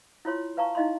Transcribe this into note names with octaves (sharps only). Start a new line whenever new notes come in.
E4 F4 C#5 C6
B4 F5 A5 A#5 C#6
D#4 E4 D#5 F5 B5 C6